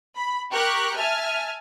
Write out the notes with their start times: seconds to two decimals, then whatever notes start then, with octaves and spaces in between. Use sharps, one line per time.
0.17 B5
0.51 G4 A#4 C#6 F#6
0.97 E5 G#5 A5 F6